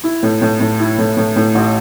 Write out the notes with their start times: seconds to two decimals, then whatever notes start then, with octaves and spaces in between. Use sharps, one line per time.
0.04 E4
0.23 A2
0.42 A2
0.60 A2
0.80 E4
0.98 A2
1.17 A2
1.36 A2
1.55 A1